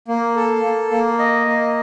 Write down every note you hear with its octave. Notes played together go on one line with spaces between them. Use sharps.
A#3
A4
A#3
A#3
D#5
A#3